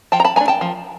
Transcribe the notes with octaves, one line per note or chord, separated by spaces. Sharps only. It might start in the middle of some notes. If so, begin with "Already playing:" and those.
F3 G5 A5
A#5
A5 B5
A3 D4 G#5 A#5
G5 A5
F3